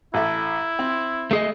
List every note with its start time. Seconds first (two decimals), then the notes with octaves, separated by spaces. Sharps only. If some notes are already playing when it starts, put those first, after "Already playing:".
0.14 A1 E4 A4 E5
0.79 C4
1.31 A3 G#4 D#5